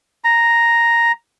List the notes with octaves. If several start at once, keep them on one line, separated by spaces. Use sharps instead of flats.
A#5